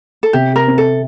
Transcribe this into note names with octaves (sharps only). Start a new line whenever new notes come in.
A4
C3 G4
A#4
C4
A4